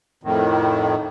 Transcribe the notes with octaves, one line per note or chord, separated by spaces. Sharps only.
F2 A2 D#3